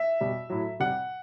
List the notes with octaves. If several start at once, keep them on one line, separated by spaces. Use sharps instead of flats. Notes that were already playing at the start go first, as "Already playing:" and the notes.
Already playing: E5
B2 G3
A2 F#3
C3 G3 F#5